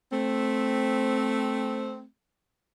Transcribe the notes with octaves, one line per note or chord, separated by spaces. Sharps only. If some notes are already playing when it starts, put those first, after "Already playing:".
A3 C4